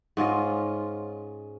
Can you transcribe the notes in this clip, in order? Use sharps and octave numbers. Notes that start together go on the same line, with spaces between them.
G#2 C#4 F4 D#5